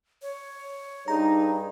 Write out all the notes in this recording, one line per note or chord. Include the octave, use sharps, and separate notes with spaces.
C#5
G2 D#4 G#4 A#5